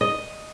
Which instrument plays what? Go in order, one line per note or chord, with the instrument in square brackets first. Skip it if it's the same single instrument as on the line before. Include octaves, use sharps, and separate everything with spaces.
[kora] D#5